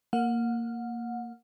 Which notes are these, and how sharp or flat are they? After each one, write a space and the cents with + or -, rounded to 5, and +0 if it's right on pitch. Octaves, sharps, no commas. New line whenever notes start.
A#3 -10 F#5 -30